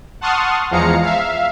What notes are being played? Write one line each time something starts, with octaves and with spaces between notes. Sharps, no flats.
F#5 A5 C6 C#6 D#6 F6
E2 F3 G#3 F5 A#5 C#7
E5 F5